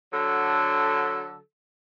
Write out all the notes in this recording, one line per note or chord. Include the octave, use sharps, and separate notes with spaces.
D3 F#3 A4